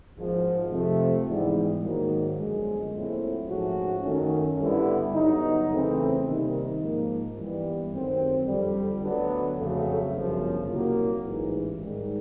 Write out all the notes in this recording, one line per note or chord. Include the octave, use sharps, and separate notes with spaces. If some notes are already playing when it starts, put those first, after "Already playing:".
G#1 G#2 F3
F2 C3 F3 A3
G#2 E3 G3 B3
G#2 D#3 F#3 A#3
G1 F#2 D3 F3 G#3
A#2 F#3 A3 C4 E4
G#2 F3 A3 C#4 F#4
F#2 D#3 F#3 A3 C#4
G2 D3 G3 B3 E4
G2 D3 F#3 B3 D#4
E2 C#3 E3 A3 C4
C3 D#3 G3 A#3 D#4
G#2 F3 A#3 D#4
G2 E3 G3 B3
F#2 D#3 F#3 A3 C4
F2 D3 G3
D2 D3 F#3 B3 D4
F2 C#3 F#3 A3
G1 F#2 C#3 F3
C2 A#2 F#3 A#3
A1 G#2 E3
G#2 D#3 G3